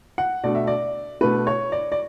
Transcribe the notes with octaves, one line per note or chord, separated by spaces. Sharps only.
F#5
B2 A3 D4 D5
E5
D5
B2 A3 D4 B4
C#5
D5
D5